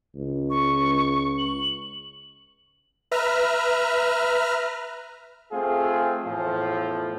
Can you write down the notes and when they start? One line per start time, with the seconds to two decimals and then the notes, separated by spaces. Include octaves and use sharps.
0.15 C#2
0.50 C#6
1.38 F#7
3.12 B4 E5 A#5 F6
5.51 A3 C4 F4 G#4
6.23 E2 A2 F3